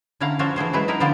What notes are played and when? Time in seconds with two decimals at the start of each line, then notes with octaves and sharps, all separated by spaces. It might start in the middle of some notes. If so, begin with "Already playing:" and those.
0.20 D3 C#4 E4 F5 F#5 A#5
0.39 F3 C#4 D4 F#4 C5 C#5
0.56 E3 A3 G#4 C5
0.73 F#3 G#3 E4 B4
0.88 D#4 E4 A#4 B4
1.00 D3 F3 B3 F4 C5 D5